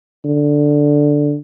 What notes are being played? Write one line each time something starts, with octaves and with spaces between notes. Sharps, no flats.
D3